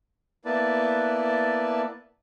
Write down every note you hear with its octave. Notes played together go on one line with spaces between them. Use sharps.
A#3 B3 E4 B4 D5 A5